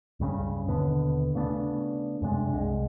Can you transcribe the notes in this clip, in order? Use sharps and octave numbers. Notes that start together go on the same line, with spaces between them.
C#2 G2 C#3 C#4
D#2 B2 D3 B3
C#3 A3 B3 D4
F#2 C3 G#3 D4
C2 G#3